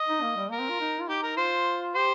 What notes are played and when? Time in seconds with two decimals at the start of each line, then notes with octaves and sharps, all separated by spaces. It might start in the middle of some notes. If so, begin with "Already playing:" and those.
Already playing: D#5
0.09 D#4
0.22 A#3
0.36 G3
0.51 A#3 A#4
0.60 C4
0.70 F4
0.81 D#4
1.01 F4
1.09 D#4 G4
1.23 A#4
1.37 F4 C5
1.95 G4 C5